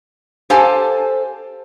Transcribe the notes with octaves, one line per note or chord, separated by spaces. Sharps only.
G4 A4 C5 F5 G#5 A5